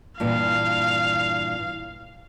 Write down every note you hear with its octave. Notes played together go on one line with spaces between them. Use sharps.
G2 A#2 E3 F5